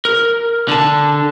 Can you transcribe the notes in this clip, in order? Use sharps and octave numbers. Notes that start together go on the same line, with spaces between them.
A#4
D3 A5